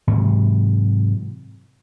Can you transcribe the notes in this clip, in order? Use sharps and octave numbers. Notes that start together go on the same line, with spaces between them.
G#2 C3 E3 F#3